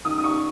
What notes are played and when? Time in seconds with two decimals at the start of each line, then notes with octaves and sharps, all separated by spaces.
0.05 D#3 D#6
0.18 D#6
0.24 D#3 C#6